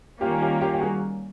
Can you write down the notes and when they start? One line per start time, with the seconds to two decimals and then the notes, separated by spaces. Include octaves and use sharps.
0.21 D#3 G3 A#3 C#4 F4 G4
0.42 F4 G4
0.61 F4 G4
0.73 G4
0.81 F#4 G#4